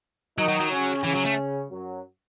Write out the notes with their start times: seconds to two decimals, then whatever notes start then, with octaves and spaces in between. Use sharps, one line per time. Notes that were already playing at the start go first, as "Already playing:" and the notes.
0.38 D#3 F#3 D#4
0.48 F#3
0.60 F#3
0.70 C#3 C#4
1.04 C#3 E3 C#4
1.15 F#3
1.26 A3
1.70 F#2 F#3